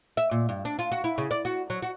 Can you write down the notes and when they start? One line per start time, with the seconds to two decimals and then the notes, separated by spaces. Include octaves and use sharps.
0.17 E5
0.31 A#2
0.49 G2
0.65 D4
0.79 F4
0.92 F#4
1.04 E4
1.18 C#3
1.31 D5
1.45 F#4
1.70 F#3
1.82 F#4